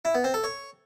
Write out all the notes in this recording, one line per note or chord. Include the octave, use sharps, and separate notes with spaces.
E4
B3
C4
A4
C#5